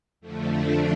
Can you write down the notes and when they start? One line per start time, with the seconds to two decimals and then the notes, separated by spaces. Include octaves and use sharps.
0.21 F2 D3 F3 A3
0.50 D4